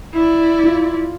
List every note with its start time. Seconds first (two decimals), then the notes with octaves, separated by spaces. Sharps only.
0.14 E4 D5
0.64 F4